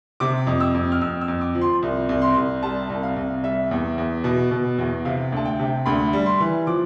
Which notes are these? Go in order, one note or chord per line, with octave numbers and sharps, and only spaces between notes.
C3 D6
F2
E6
F2
F6
F2 E6
E6
F2
D6
F3
C6
C2
C2
C6
C2
G3 A5
C2
F5
C2
G3 E5
E2
E2
B2
B2
E2
C3 F5
D2 A5
G5
C3
D2 B5
G3
C6
E3
F3 D6